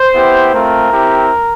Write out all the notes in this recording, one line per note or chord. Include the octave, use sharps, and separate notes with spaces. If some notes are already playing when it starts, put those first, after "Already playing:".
Already playing: C5
B3 E4 G4
A3 C4 F4 A#4
C4 E4 G4